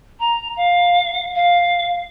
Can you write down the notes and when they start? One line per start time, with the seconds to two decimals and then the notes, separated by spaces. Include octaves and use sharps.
0.20 A#5
0.57 F5
1.35 F5